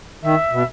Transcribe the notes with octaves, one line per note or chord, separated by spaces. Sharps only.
D#3 E5
B2